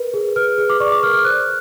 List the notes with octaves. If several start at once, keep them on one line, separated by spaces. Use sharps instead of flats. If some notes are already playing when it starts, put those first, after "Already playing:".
Already playing: A#4 B4
G#4
B4 F6
G#4
D6
D5 C#6
D6
A#4 F6
F6
C5 F#6